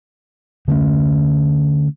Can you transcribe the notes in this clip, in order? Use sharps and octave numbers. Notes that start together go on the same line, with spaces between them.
D3 A3 C4 C#4